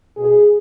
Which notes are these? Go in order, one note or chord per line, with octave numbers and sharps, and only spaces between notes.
B2 G#4